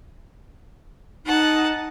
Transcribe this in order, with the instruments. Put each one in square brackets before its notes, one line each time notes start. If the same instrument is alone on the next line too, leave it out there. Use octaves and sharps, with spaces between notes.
[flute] D#4 [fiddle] F#5 A5